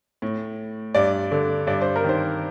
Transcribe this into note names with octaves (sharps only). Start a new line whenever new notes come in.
A2
G2 D5
D3
G2 D5
C5
A#4
D#3 C5